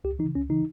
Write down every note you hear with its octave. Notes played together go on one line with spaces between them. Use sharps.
C#2 G4
E3 D#4
C#3
C#2 C#4
C#3 E3 D#4